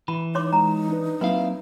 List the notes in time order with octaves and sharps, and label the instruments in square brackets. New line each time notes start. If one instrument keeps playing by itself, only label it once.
[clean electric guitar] E3 [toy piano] B5
[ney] D#4 [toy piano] C#5 C6 D6
[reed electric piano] G#3 [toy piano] A#5
[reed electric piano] D4 B4
[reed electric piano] F#3 A#3 C4 [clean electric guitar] E4 F5 [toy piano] B4